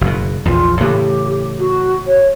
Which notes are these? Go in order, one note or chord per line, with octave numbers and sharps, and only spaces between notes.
F#1 B2
A#1 E2 F4
A2 C#3 E3 G4
F#4
C#5